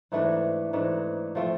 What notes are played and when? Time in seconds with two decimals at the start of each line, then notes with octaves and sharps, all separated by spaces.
0.12 G#2 E3 A3 D4
0.73 G#2 E3 A3 D4
1.35 F3 A3 C4 F4